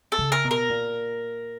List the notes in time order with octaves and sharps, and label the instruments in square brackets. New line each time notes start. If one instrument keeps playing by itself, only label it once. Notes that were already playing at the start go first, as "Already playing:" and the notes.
[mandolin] A4
[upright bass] C#3
[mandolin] A#4
[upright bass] B2
[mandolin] A#4
[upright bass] A#2